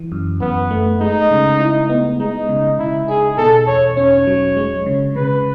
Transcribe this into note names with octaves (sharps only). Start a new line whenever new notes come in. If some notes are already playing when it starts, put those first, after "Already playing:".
Already playing: E3
F#2
F#2 B3
A3
G#3 D#4
C#3
E4
B3
G#3 D#4
C#3
C#3 E4
D#4 G#4
B2 A4
E2 C#5
C#4 C#5
F#3
G#3
C#3
C#3 B4